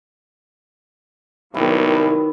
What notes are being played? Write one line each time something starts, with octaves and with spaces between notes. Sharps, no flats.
C2 D#3 F#3 B3 E4